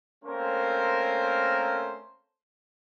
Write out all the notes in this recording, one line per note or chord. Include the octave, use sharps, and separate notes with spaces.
A3 A#3 C4 C#4 A#4 C5